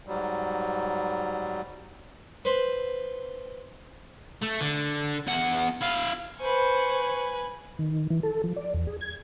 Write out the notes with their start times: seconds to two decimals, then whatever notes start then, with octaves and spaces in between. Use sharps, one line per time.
0.07 G#2 F#3 G3
2.45 B4 C5
4.43 A3
4.61 D3
5.27 E2 F#5
5.82 E4 F5
6.40 B4 C5 G#5 C#6
7.79 D#3
8.10 E3
8.23 A4
8.44 F3
8.56 D5
8.74 E2
8.87 G#4
9.01 G#6